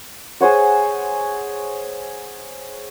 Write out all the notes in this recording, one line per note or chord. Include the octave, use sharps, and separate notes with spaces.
G#4 C5 C#5 F#5